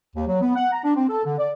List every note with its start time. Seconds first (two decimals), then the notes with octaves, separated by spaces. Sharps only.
0.15 D#2
0.27 F#3
0.42 B3
0.55 F#5
0.72 A#5
0.84 D4
0.95 C4
1.09 A4
1.24 D3
1.38 D5